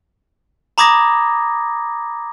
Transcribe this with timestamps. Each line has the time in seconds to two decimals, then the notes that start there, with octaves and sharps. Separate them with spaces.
0.78 A#5 B5 D6 D#6 G#6 A#6